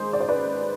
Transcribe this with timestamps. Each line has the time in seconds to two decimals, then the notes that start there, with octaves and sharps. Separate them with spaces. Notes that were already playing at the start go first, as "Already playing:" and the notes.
Already playing: G#2 D#3 G#4 C5
0.13 D5
0.20 C5
0.28 B4 D5